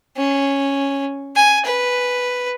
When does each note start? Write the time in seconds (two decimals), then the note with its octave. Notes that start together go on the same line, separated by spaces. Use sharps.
0.17 C#4
1.36 G#5
1.65 B4